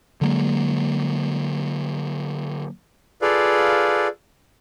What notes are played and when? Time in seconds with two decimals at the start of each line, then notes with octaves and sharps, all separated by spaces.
0.21 D3 F#3 G#3 A#3
3.22 F4 G#4 A4 B4 D5 F5